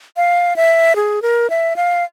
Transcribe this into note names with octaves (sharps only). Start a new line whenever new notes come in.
F5
E5
G#4
A#4
E5
F5